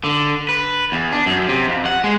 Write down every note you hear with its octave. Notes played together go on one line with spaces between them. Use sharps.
D3
B4
E2
D4
F#2
C3
F2
F#5
G#3